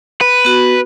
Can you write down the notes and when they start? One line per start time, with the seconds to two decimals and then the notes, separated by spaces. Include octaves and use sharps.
0.21 B4
0.45 B3 F#4